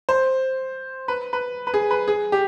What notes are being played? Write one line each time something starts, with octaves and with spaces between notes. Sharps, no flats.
C5
B4
B4
B4
G#4
B4
G#4
G4